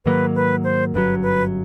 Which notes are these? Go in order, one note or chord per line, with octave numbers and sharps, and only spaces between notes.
G#2 D#3 F#3 A#3 B4
B4
C5
G1 F#2 D3 F#3 B4
B4